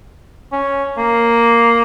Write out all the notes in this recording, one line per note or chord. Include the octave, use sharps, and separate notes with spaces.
C#4
A#3